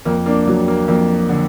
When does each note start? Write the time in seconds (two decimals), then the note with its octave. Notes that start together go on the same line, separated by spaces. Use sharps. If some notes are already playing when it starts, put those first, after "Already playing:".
0.05 F2 A#3
0.26 A#3 D4
0.47 F#3
0.68 A#3
0.88 F2 A#3
1.29 D3